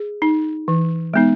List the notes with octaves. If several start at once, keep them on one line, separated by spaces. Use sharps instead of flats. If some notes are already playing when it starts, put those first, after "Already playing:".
Already playing: G#4
D#4
E3
G#3 B3 D#4